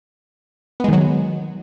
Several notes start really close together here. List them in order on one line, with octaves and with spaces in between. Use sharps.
B3 G#3 D#3 F#3